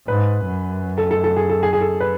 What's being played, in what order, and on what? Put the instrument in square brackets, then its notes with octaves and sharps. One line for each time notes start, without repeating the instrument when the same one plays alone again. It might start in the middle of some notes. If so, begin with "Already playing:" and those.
[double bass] G#2 [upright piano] B4
[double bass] F#2
[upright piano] A4
A4
A4
G#4
A4
G#4
G#4
A4
B4